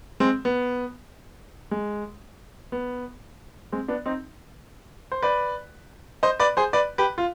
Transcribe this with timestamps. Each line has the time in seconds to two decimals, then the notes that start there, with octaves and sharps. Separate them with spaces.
0.20 G#3 C4
0.45 B3
1.71 G#3
2.72 B3
3.72 G#3 C4
3.88 B3 D4
4.06 C4 D#4
5.12 C5
5.22 B4 D5
6.23 C5 D#5
6.40 B4 D5
6.57 G#4 C5
6.73 B4 D5
6.98 G4 B4
7.18 F4